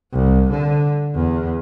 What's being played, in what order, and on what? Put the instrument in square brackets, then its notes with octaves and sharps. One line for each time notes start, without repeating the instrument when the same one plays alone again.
[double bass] C2
D3
E2